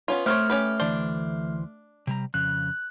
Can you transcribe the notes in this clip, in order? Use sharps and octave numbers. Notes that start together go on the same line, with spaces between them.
B3 C#4 F4
A3 C4 C5 C#5 F6
C#4 G4 B4
D2 E3 D4 C5
C3 G3 A#5
F2 C#3 F#6